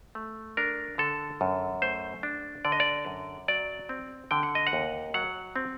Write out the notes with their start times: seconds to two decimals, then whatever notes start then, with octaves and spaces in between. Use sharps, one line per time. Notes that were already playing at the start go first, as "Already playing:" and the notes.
0.15 A3
0.57 D4 A#4
0.98 D3 A4
1.41 F#2
1.82 A3 C5
2.23 D4
2.65 D3 D5
2.72 D#5
2.80 D5
3.06 F#2
3.48 F#3 D5
3.89 C4
4.31 D3 G5
4.43 F#5
4.55 D#5
4.67 F#5
4.73 D#2
5.14 F#3 F#5
5.56 C4